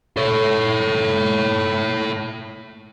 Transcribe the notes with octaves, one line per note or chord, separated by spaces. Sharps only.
A4 C#5